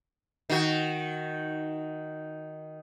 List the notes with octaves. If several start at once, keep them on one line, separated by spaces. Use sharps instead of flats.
D#3 F#4